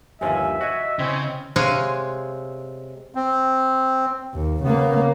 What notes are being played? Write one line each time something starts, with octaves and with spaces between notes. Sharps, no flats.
G1 D#2 F3 E5 G#5
F#4 D#5 G#5
C#3 C4 C#4 E4
C3 G#3 C#5 F5 F#5 G#5
C4
D#2
C#3 A#3 B3